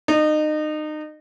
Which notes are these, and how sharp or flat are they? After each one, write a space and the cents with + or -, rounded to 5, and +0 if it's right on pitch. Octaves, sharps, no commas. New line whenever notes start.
D#4 -30